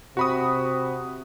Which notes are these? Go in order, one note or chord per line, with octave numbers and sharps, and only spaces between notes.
C3 F#4 B5 D#6